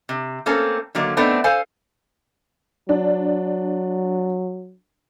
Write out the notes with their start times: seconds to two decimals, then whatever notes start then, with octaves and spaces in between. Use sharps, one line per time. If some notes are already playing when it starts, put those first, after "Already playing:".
0.09 C3
0.46 A3 A#3 C4 C#4 A4
0.95 D3 D#3 F#3 A3 A#3
1.17 A3 B3 C4 D4 D#4
1.44 A4 C5 F5 G#5
2.89 F#3 D4